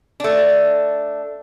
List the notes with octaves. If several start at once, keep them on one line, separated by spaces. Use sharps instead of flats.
A3 D4